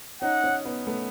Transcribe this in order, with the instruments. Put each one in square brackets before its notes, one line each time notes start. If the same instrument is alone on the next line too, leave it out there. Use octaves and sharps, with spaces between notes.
[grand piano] C#4 D#4 [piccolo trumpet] F#5
[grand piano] C#4 D#4
B3 C#4
A3 B3